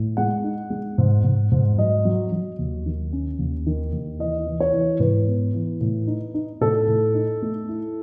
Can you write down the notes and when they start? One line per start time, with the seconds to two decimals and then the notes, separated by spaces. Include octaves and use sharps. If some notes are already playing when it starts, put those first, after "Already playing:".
Already playing: A2
0.17 G#3 F#5
0.44 D#4
0.70 G#3
0.98 G#2
1.24 G#2
1.52 G#2
1.78 F#3 D#5
2.05 F#3
2.32 F#3
2.59 D#2
2.86 D#3
3.13 C#4
3.39 D#2
3.67 D#3
3.92 D#2
4.19 E3 D#5
4.47 E3
4.60 C#5
4.73 E3
5.00 G#2 B4
5.26 B3
5.53 E3
5.81 A2
6.07 D#4
6.34 D#4
6.61 A2 A4
6.87 A2
7.14 D#4
7.42 A3
7.69 E4